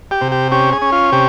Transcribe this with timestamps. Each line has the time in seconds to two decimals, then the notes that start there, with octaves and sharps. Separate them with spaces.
0.11 G4
0.21 C3
0.32 G4
0.52 C#4 G4
0.72 G#4
0.82 C#4
0.92 F4
1.12 C3 G4